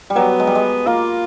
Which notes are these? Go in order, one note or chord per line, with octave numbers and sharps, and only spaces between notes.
G3
F#3 B3
G#3
G3
G#3
A#3 F4